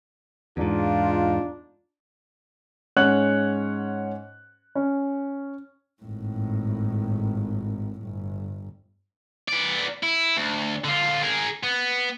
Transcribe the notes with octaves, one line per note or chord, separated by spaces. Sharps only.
E2 G#2 D4 D#4 F4
G#2 C#4 C#5 F#5 F#6 F#7
C#4
G#1 A2
G1
B3 D5
E4
D2
D3 F4
G#4 A#4
B3